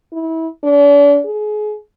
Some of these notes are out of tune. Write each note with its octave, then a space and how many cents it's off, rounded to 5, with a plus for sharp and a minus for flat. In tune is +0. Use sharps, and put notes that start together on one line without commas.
E4 -25
D4 -40
G#4 +30